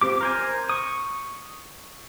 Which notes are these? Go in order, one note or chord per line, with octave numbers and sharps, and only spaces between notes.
F3 C4 G4 D6
A#4 C5 G#5
C#6 D#6